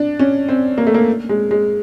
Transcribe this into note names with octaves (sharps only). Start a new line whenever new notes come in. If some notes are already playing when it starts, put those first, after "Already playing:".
Already playing: D4
C#4
C4
A#3
A3
A#3
G#3
G#3